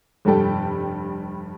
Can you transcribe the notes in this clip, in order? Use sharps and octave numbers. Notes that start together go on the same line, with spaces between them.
F1 G2 G3 A4 G5